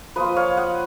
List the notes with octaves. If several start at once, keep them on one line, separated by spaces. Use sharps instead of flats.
F3 A#3 F4 B4 D#5
C#5 F5
D#5 F#5